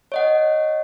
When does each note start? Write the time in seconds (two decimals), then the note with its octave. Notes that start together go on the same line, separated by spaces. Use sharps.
0.12 C#5 D#5 F#5